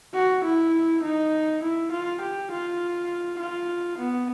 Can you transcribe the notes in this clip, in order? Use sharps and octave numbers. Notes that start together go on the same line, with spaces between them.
F#4
E4
D#4
E4
F4
G4
F4
F4
B3